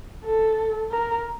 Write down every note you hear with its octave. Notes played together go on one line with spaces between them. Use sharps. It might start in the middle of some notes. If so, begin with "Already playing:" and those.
A4
A#4